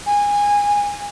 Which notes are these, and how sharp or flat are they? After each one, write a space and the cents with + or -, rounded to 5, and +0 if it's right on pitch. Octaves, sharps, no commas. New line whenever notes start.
G#5 -20